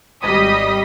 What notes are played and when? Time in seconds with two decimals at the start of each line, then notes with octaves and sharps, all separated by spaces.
0.23 G#1 G3 D#5 D#6 B6